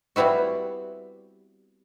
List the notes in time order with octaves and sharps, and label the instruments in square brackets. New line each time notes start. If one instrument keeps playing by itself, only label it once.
[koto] G3 B3 C4 E4 F#4